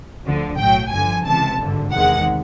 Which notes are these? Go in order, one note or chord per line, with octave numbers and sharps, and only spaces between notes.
D2 D3 F3
B1 A2 F#3 G5
G2 D3 F3 G#5
C#2 C3 E3 G#3 A5
G#1 G2 D3
E2 C3 D#3 G#3 F#5